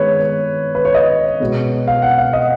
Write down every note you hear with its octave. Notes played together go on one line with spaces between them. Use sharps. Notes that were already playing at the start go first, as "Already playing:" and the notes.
Already playing: D#3 G#3 B3 B4 C#5
B4
C#5
D#5
B2 G#3 B3
F5
F#5
F5
D#5